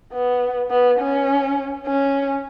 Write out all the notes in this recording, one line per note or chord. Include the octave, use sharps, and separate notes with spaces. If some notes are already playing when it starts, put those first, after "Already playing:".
B3
B3
C#4
C#4